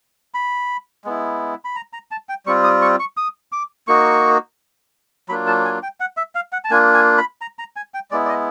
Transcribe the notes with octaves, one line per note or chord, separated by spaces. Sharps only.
B5
G#3 B3 E4
B5
A#5
A#5
A5
G5
G3 C4 F4 C#6
D#6
C#6
C#6
D#6
D6
A#3 D#4 F#4 C#6
F#3 A#3 D4 F4 B5
A5
G#5
G5
F#5
E5
F5
F#5
A5
A#3 D4 F4 G#5
G#5
B5
A#5
A#5
G#5
G5
G#3 B3 E4 D5
D5
D#5